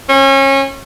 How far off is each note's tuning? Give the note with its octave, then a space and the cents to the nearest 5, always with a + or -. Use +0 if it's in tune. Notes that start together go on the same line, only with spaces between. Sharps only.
C#4 -30